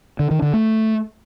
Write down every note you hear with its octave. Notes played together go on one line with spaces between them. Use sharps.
D3
D#3
D3
A3